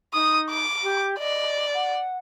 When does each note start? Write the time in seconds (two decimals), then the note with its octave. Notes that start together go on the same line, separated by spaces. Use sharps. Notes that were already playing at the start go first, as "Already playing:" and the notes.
0.14 D#4 D#6
0.50 D6
0.83 G4
1.18 D5 D#5
1.74 F#5